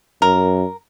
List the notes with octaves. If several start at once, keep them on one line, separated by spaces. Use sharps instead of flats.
F#2 A#4